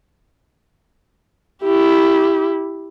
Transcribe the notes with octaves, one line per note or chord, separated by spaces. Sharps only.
E4 G4